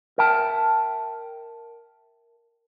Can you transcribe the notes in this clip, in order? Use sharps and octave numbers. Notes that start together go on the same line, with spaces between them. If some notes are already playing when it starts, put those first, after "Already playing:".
A#4 E5 G5 A5